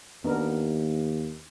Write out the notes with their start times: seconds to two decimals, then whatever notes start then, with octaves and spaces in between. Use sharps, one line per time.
0.25 D#2 B3 D4 A#4